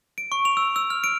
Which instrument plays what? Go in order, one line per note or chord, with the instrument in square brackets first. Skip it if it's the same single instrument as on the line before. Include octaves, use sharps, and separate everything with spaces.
[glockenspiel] D7
C#6
F7
E6
E6
F6
D7